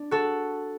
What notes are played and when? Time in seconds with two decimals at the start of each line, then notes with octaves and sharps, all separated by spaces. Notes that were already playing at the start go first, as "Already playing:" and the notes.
Already playing: D4
0.11 F#4 A4